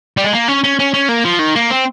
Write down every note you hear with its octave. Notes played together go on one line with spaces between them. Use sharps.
G3
G#3
A#3
C#4
C#4
C#4
C#4
A#3
F3
D#3
A#3
C4